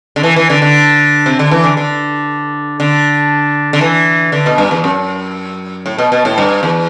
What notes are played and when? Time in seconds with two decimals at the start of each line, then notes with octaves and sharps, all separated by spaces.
0.16 D3
0.23 E3
0.36 E3
0.50 D3
0.62 D3
1.26 C3
1.39 D3
1.51 E3
1.64 D3
1.77 D3
2.80 D3
3.73 D3
3.81 E3
4.32 D3
4.46 B2
4.58 G2
4.71 E2
4.84 F#2
5.86 A2
5.98 B2
6.12 B2
6.25 A2
6.38 G2
6.63 E2